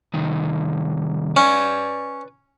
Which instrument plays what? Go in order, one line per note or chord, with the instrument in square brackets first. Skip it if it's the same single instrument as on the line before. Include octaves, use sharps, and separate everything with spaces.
[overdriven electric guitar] C2 D#3
[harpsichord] C#4 [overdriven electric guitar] B4 D5